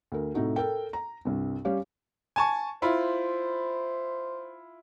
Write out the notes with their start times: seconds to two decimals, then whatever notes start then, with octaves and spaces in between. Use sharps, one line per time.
0.12 D2 A#4
0.34 A2 C3 D#4 F#4
0.56 A4 A#4 G5
0.93 A#5
1.25 C2 G2
1.65 G3 C#4 G4 C#5 F5
2.36 G#5 A5 C#6
2.82 E4 F4 C5 B5